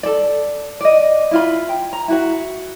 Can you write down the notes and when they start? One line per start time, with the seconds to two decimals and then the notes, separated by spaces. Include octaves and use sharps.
0.03 A4 D5
0.81 D5 D#5
1.31 E4 F4 B5
1.69 G5
1.93 A#5
2.08 E4 F#4 F#5